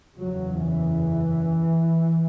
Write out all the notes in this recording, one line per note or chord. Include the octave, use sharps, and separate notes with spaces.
F#1 E2 C#3 F#3
E3